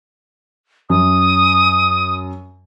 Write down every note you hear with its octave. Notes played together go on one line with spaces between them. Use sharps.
F#2 D#6